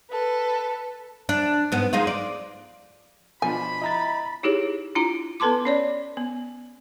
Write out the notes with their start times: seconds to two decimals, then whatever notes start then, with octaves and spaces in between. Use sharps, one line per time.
0.11 A4 B4
1.29 D4
1.72 G#2 B3
1.93 G#3 D#4 F4
2.07 D5
3.42 B2 F3 D4 G#5 B5
3.82 E4 D#5 A#5 A6
4.43 D#4 E4 G4 G#4 C#5
4.95 D4 E4 F4 A#5
5.40 B3 A4 B4 A5 C6 D6
5.65 C#4 C#5 D5
6.17 B3